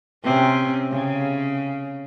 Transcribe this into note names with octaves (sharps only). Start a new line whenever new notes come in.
C3 C4 C#4
C#3